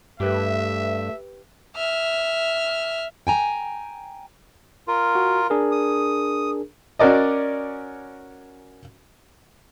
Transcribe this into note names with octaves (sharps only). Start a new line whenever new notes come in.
G2 A3 G4 B4 E5
E5 F6
G5 G#5 A#5
F4 A#4
F#4
D4 G#4 A#4
D#6
C#4 F#4 A#4 D5 D#5